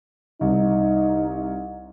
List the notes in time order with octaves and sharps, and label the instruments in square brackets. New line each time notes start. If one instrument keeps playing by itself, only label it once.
[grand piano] C2 [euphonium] D#4